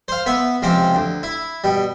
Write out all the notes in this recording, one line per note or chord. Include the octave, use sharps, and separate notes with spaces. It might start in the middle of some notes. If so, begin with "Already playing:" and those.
C5 F5
B3 B4 E5
C#2 C3 F3 C4 D6
D2
E4
B2 G3